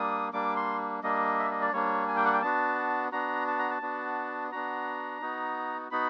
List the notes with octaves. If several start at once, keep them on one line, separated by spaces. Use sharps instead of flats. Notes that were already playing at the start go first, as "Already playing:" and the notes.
Already playing: G3 A#3 D4 D#6
G3 A#3 D4 D6
C6
G3 A#3 D4 D#5
E5
D#5
D5
G3 A#3 D4 C#5
G#5
G5
F#5
G5
B3 D4 F#4 A5
B3 D4 F#4 A#5
A5
A#5
A5
B3 D4 F#4
B3 D4 F#4 A#5
B3 D#4 F#4
B3 D#4 F#4 B5